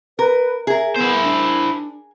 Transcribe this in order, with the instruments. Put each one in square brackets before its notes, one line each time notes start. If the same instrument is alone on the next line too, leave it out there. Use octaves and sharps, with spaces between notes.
[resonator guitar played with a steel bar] A#4 [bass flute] B4
[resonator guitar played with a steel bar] G#4 A#4 [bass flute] E5
[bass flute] B3 [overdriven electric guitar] E4 C5
[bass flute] D4